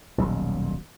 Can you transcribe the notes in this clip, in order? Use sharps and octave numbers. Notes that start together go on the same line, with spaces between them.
D#1 B1